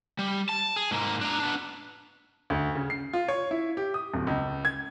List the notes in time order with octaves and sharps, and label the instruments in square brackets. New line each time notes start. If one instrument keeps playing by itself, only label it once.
[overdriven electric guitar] G3
A5
G#4
G#2 A#3
D4 A#5
B3 D4
[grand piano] D2
C#3
C7
F4
C#5
E4
G4
D#6
D1
C#2
G#6